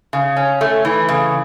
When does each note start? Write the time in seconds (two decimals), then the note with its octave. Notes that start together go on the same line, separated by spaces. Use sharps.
0.13 C#3
0.36 C#4
0.61 A3
0.85 E3
1.09 C#3